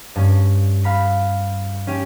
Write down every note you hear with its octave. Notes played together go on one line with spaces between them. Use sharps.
G2 C#4
F5 B5 B6
C#4 G4